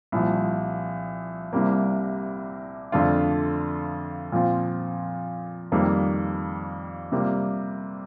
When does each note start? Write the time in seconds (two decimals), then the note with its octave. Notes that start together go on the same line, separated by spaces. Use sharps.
0.12 C2 A#2 F3
1.53 C2 C3 G3 A#3
2.92 F2 D3 A3 D4 F4
4.32 A#2 F3 C4 F4
5.72 F2 D#3 G3 A#3
7.12 C3 G3 A#3 F4